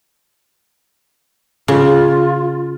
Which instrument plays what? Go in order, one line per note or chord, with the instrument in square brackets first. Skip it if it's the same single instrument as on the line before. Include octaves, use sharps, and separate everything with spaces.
[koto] C#3 [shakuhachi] F4